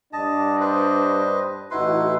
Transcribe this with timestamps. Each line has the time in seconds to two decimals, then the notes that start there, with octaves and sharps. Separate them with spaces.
0.13 G2 D4 D#5 A5
0.61 B4 C5 D#5
1.71 A1 D#4 E4 F#4 B4 C6